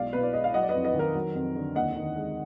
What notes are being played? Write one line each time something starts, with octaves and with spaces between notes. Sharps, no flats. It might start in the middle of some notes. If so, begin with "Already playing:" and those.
Already playing: B1 G#3 D5 F5
B2 B4
D5
G#3 D#5
F5
F#3 D#5 F#5
D5
B4 D#5
F2
B4 D#5
D#3
A#4
F#3
F2
D3
D#2 D#5 F#5
D#3
G#3